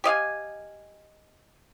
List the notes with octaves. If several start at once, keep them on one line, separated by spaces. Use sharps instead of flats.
G4 D#5 F5 G#5